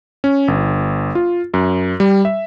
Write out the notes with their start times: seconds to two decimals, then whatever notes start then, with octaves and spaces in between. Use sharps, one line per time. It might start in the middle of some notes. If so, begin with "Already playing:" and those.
0.24 C#4
0.48 G1
1.15 F4
1.54 F#2
2.00 G3
2.25 E5